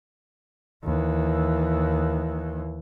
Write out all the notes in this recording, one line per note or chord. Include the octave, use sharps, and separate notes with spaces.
D#2 E3